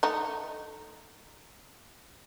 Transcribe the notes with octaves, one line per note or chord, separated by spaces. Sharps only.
A3 D#4